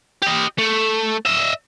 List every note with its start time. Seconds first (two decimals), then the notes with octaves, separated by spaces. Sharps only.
0.22 G4 D#5
0.58 A3
1.26 D#5 E5